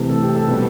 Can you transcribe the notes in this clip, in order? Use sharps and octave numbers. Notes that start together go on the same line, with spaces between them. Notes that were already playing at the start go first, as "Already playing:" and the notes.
Already playing: C3 E3 A3
A4
G4
A4
B2 G3 B4